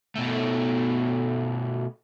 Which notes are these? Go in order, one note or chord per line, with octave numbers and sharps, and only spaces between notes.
B2 A3